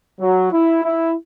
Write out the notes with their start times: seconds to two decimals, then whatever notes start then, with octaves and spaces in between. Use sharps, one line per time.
0.21 F#3
0.52 E4
0.84 E4